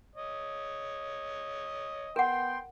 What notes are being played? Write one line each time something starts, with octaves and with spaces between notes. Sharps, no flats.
C#5 D#5
B3 A#4 F#5 G5 C6